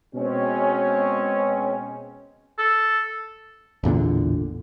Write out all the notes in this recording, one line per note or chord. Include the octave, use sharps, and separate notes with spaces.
B2 G#3 C4 C#4
A4
A1 E2 A#2 D3